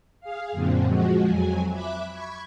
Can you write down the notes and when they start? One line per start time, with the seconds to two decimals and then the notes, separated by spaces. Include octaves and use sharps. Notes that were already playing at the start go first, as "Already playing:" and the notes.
0.20 G#4 F5
0.52 F#2 A#2 D3 C4
0.85 F3 G#3 F#4
1.25 F2 F#3 G#5
1.69 E5 B5 D6 F#6
2.11 B5 C#6 G#6